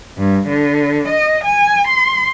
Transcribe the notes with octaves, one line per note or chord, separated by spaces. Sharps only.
G2
D3
D#5
G#5
C6